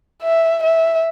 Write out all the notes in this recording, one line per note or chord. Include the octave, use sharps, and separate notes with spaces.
E5
E5